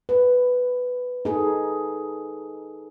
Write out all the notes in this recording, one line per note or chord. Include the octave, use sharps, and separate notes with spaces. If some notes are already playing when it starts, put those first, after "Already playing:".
B4
D#4 G#4 A4